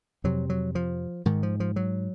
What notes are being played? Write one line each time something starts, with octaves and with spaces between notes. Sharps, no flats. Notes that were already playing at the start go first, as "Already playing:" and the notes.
F2 C3 F#3
F#3
F3
G#2 D#3
F3
F3
F#3